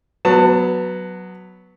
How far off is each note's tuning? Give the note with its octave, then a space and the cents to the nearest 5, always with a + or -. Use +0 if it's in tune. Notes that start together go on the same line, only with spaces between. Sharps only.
F#3 +0 B3 +0 A5 +25